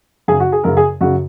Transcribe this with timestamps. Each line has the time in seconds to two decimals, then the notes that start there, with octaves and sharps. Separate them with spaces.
0.28 F#2 C#3 G#4
0.40 F#4
0.52 G#4
0.64 F#2 C#3 A#4
0.77 G#4
1.01 F#2 C#3 F#4